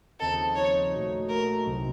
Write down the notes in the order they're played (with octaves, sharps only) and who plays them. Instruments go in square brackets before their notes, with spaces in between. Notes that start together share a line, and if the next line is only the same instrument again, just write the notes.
[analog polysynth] D#2 C#3 F3 C4 D#4 [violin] A4
[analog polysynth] D#2 C#3 F3 C4 D#4 [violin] C#5
[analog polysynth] A#2 A3 D#4 F#4
[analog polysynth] A#2 A3 D#4 F#4 [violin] A#4
[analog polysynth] C2 C3 F#3 C4 D#4